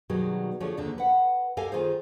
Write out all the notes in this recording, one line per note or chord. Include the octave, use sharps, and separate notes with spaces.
B2 D#3 F#3 G3 G#4 A#4
D3 F3 A3 G4 G#4 C#5
D#2 D3 F3
B4 F#5
G4 A4 A#4 D#5 F5 G#5
D#3 F4 G#4 C5